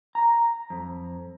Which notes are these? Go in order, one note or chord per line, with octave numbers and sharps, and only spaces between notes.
A#5
F2